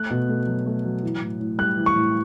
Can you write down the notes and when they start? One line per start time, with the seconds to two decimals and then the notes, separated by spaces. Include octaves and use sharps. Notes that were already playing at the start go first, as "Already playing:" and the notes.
Already playing: A3 F#6
0.11 B2
0.29 A3
0.47 F#3
0.66 A3
0.85 F#3
1.03 E3
1.22 A2
1.40 A2
1.58 G3 F#6
1.77 E3
1.86 C#6
1.96 A2